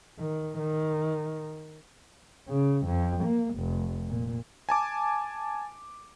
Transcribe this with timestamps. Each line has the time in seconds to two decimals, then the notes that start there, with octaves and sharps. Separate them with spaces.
0.20 D#3
0.59 D#3
2.48 C#3
2.86 F2
3.24 A#3
3.55 F1
4.08 A#2
4.69 G#5 A5 D6